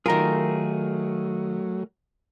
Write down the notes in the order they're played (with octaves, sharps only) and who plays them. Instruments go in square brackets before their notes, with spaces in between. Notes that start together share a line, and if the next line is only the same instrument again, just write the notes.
[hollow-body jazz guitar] D#3 F4 [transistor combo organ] F#3 [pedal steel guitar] A3 G#4 [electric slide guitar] A#4 A#5